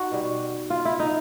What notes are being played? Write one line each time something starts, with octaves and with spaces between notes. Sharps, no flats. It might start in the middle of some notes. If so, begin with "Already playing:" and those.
Already playing: D#4 F#4
B2 G3
F4
E4
D#4